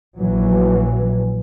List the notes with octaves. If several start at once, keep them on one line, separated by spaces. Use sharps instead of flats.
A#1 E3 F#3